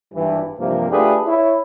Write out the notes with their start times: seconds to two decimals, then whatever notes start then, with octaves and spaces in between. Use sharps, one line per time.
0.14 G#1 G2 E3
0.59 G2 C3 E3 F3 A#3
0.91 A3 D4 F4 G4 G#4 B4
1.26 E4 C#5 E5